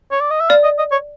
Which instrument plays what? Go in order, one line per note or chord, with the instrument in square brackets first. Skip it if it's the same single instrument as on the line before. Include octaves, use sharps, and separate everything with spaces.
[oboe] C#5
D5
D#5
E5
[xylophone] D5 [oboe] F5
[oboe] D#5
D#5
C#5